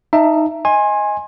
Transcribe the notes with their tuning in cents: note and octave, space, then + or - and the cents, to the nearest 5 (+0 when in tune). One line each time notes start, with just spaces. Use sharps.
D#4 +0 E5 +20 A5 +20
D#5 +15 G#5 -5 C6 +30